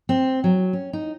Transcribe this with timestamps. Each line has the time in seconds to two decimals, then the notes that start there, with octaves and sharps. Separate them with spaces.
0.09 C4
0.44 F#3
0.73 C#4
0.93 D#4